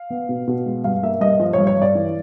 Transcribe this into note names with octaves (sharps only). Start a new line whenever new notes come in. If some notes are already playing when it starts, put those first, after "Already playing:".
Already playing: F5
B3
B2
B2
G#3
G2 F5
A#3 E5
G2 D#5
F3
C#5
G2
C#5
G2 D5
E3